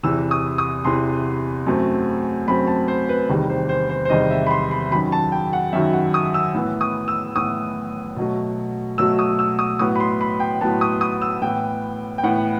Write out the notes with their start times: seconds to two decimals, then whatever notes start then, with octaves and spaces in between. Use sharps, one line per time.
0.03 E2 C3 E3 E6
0.31 D#6
0.58 D#6
0.84 E2 C3 E3 C6
1.67 F#2 F#3 A3 C4
2.48 F#2 F#3 A3 C4 B5
2.67 A5
2.88 C5
3.09 B4
3.29 E2 C3 D#3 G3
3.49 C5
3.69 C5
3.89 C5
4.05 C5
4.10 E2 C3 D#3 G3 D#5
4.31 E5
4.47 B5
4.51 C6
4.71 B5
4.91 F#2 D#3 F#3 B5
5.12 A5
5.32 G5
5.53 F#5
5.73 F#2 D#3 F#3 E5
5.93 F#5
6.14 D#6
6.34 E6
6.54 A2 E3 B3
6.81 D#6
7.08 E6
7.36 A2 E3 B3 D#6
8.16 B2 F#3 A3
8.98 B2 F#3 A3 E6
9.19 D#6
9.39 E6
9.59 D#6
9.79 A2 F#3 B3 D#6
9.96 B5
10.00 C6
10.21 B5
10.40 G5
10.61 A2 F#3 B3 A5
10.81 D#6
11.01 D#6
11.22 E6
11.42 A2 E3 B3 G5
12.18 G5
12.23 A2 E3 B3 F#5